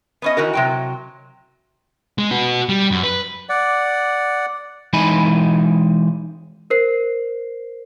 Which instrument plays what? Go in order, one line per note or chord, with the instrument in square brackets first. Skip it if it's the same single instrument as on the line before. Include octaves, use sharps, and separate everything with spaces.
[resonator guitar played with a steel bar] B3 C#4 D#5
D#3 E3 F#4 A#4
C3 F#3 G5
[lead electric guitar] G#3
F#4 B4
G3
F#2
B4
[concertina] D5 F#5
[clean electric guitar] E3 G#3 D#4 G#5 B5
[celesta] A#4 C5 C7